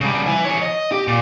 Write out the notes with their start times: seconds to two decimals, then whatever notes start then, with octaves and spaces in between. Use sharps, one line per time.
0.01 C#3 G3
0.26 E4 G#5
0.45 E3 C#5
0.62 D#5
0.92 G4
1.08 A#2